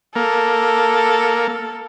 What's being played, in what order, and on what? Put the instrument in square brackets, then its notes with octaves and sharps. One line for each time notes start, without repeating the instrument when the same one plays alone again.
[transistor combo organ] A#3 [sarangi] A4